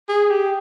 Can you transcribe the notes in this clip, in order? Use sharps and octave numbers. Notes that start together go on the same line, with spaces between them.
G#4
G4